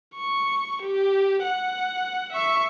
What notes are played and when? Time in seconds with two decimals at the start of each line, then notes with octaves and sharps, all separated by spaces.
0.16 C#6
0.82 G4
1.44 F#5
2.32 E5 C#6